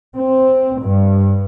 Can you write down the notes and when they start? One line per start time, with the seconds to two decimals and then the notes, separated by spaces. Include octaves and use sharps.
0.15 C4
0.82 G2